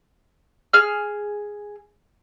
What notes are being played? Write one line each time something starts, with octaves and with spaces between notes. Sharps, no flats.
G#4 F6